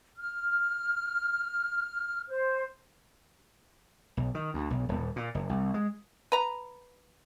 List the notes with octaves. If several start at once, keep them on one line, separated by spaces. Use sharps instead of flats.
F6
C5
B1
D#3
D2
B1
D#1
A#2
F#1
C2
G#3
B4 A#5